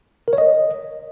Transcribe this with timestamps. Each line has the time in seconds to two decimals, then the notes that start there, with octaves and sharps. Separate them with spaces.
0.28 A#4
0.33 C#5
0.38 D#5